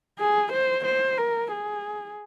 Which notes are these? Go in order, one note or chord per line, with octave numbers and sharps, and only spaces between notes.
G#4
C5
C5
A#4
G#4